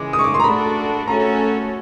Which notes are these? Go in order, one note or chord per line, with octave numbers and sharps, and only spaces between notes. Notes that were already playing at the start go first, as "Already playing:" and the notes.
Already playing: C#3 E3 G#3 D6
D#6
C#6
D6
C6
A#5
A3 D4 F#4 A4 B5
A3 C#4 F#4 A4 A#5